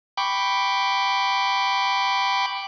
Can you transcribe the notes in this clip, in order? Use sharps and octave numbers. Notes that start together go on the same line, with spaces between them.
G5 B5 C#6 D6